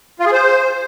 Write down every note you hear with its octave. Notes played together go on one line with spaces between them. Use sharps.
F4
G#4
C5